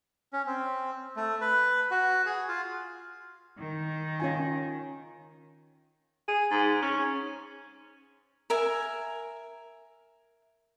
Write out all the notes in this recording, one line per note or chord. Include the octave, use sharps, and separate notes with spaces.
C#4
C4
A3
B4
F#4
G#4
F4
D#3
C#4 F4 G#5
G#4
G#2
C#4
A#4 E5 G#5